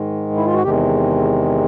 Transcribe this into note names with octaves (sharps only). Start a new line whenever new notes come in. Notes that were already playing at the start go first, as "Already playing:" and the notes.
Already playing: G#2 D#3 G#3
E4
F4
F#4
E2 C3 D#3 G#3 G4